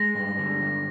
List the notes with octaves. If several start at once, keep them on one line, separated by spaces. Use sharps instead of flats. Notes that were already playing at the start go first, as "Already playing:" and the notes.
Already playing: G#3 A#6
G2
D3
G2